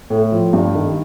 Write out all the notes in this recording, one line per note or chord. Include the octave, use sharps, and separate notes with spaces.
A2
F3
G2
D#3